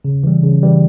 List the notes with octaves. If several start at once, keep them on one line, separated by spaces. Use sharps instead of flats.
C#3
E3 G3
C#3
E3 G3